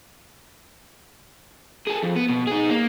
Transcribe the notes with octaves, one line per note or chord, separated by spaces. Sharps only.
G#4 A4
F2
B3
B2
D#4 G#4
A#3